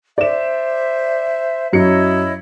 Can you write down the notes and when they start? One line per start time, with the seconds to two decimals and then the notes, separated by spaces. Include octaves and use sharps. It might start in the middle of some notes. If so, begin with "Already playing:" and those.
0.18 C5 D5 E5 E7
1.73 F#2 F#3 E4 C#5 D#5 C#7